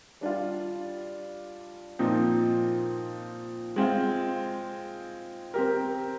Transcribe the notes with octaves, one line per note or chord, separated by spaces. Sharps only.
G3 D4 F4
A#2 F3 C4 D#4
G#3 C4 F4
C4 G4 A#4